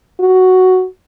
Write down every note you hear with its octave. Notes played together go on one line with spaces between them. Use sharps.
F#4